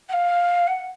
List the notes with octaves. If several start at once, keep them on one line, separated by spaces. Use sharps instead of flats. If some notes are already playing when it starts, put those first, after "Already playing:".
F#5
F5
F#5